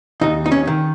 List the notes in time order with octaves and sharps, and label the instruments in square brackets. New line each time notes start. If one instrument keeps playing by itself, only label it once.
[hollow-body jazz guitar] D#2 D#4
D#4
C#4
D#3